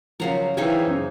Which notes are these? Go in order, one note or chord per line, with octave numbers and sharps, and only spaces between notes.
C#3 F3 F#3 A#4 A#5 C7
E3 D#4 G#4 C5 C#5 F5 G5
F#2 C#3